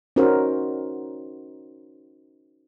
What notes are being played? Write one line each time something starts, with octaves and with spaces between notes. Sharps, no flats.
C#4 D#4 F#4 A#4 C5